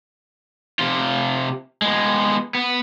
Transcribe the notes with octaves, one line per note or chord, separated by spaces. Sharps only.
C3 F4
G#3 B3
B3